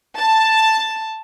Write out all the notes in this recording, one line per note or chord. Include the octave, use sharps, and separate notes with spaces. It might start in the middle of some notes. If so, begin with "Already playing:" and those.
A5